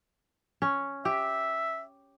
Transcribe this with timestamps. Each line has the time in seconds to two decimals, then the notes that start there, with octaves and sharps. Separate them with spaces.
0.62 C#4
1.05 G4 E5